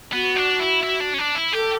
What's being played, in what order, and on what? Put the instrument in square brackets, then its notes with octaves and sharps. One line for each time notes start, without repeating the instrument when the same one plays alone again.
[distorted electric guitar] B3 [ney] F#4
[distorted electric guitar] D4
E4
E4
D4
C#4
D4
E4
[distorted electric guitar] G4 [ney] A4